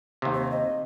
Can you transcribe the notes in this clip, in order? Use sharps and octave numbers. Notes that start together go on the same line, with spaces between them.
D#2 C3
C5
D#5